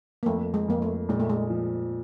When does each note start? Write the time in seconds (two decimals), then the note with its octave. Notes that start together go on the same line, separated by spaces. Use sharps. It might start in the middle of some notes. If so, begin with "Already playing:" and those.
0.23 A#3
0.26 F2 A3
0.54 G#3
0.68 F2 A#3
0.82 A3
1.09 A#2 G#3
1.20 A3
1.29 G#3
1.50 F3